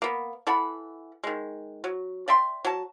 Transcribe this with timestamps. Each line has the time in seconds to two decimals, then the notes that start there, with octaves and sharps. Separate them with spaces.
0.02 A#3 B3
0.47 E3 A4 F#5 B5
1.24 D#3 G#3
1.84 F#3
2.28 D5 E5 G5 C6
2.65 F#3 A5